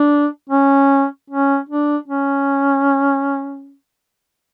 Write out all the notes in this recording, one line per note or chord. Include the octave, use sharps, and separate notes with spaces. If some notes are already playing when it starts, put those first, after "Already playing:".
Already playing: D4
C#4
C#4
D4
C#4